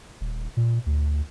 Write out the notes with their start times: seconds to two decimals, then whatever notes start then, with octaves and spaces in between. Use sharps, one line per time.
0.21 D#1
0.57 A#2
0.86 D2